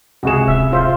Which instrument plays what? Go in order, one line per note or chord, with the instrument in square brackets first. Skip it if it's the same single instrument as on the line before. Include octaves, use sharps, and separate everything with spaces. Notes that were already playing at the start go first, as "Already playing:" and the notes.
[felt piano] C#2 C3 E7 [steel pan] F#4 G#4
[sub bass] D1 [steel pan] E5
[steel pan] F4 C5 E5